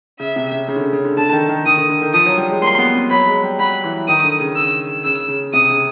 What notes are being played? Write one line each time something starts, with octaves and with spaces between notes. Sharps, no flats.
C#3 E5
C3
C#3
C#3
D3
C#3
C#3
D3
D3 A5
D3
D#3
D#3
D#3 D#6
D3
D3
D#3
F3 D#6
F#3
G3
G#3
A#3 C6
B3
C4
F#3 B5
G#3
G3
F#3 B5
E3
D#3 D#6
D3
C#3
E6
C#3 E6
C#3
C3 D#6
C#3